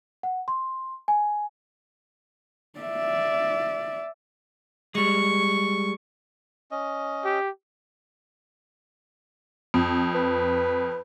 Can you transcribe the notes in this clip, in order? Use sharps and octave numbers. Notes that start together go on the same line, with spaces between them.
F#5
C6
G#5
D5 E5
G3 G#3 C#6
C#4 D#5
G4
F2
B4